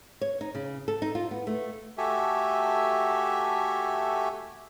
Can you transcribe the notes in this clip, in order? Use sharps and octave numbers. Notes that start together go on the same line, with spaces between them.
C#5
D#4
C#3
A4
D#4
F4
B3
A3
A3 F#4 G4 A4 E5 G#5